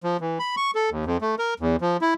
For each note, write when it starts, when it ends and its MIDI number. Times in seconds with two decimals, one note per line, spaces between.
0.04 0.17 53
0.20 0.39 52
0.39 0.55 83
0.57 0.71 85
0.75 0.90 69
0.91 1.05 39
1.06 1.17 41
1.21 1.35 57
1.39 1.54 70
1.60 1.76 40
1.81 1.97 53
2.01 2.14 64